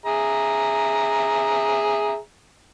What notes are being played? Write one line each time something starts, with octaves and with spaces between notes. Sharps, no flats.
G#4 E5 A#5